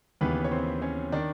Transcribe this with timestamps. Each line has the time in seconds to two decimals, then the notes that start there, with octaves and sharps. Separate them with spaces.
0.21 D#2 C#3 E3 B3 B4
0.44 C#5
0.51 C4 C5
0.82 C#4 C#5
1.12 D#3 D4 D5